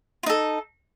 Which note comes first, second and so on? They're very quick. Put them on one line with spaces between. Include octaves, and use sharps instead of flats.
F4 D#4 A4